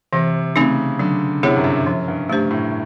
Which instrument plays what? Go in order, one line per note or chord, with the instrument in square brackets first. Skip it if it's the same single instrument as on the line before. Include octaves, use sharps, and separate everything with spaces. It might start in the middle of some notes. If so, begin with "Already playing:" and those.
[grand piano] C3 [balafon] E3
[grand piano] C#3 [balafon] A3 C4 D#4
[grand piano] D3 [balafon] F#3
[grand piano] C3 [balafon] B3 E4 G#4 C#5
[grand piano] F#2
G2
[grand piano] F#2 [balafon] F3
[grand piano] G2
[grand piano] G2 [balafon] A3 D4 G4 C5
[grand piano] A2